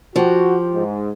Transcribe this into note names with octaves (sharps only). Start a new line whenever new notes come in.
F3 F#4 G4
G#2